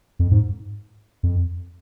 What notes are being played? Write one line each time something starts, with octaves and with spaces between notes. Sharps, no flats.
F2
G#2
F2